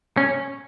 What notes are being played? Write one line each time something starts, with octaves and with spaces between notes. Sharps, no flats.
C#4